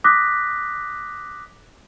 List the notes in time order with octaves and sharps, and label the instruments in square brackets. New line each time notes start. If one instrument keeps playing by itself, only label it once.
[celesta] D6 D#6 F#6 A#6 B6